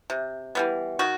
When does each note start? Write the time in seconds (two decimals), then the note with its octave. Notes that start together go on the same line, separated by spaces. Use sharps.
0.10 C3
0.55 E3 G3 B3
0.99 D#3 F#4